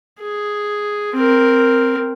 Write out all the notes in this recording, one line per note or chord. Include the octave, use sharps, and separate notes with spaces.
G#4
C4 A#4